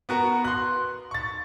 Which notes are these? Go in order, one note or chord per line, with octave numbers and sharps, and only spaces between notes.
B3 F#4 A#4
C6 F#6
C#6 A6